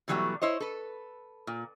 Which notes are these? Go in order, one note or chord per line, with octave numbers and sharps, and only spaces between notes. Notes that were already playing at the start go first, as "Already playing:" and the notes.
B2 E3 F#3 G3 A3 B3
E4 C5 C#5 D#5
A4 B4
A#2